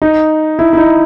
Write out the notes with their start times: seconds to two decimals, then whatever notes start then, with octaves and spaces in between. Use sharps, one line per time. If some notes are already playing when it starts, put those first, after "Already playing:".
0.02 D#4
0.59 E4
0.73 E4
0.77 D#4